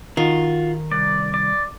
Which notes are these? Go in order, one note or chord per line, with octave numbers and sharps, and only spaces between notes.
D#3 F4 F#4
C2 D5
D5